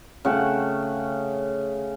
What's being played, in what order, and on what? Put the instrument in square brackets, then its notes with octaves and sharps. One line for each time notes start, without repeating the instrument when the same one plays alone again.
[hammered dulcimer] C#3 A3 F#5 G5